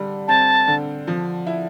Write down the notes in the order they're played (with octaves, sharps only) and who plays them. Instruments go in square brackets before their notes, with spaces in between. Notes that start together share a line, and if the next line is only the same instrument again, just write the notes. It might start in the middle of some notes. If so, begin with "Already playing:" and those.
Already playing: [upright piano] D3 G3
[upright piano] C4 [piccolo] A5
[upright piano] D3
F3
E4